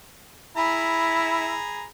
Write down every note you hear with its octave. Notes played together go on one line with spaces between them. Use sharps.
E4 G#4 A#5 B5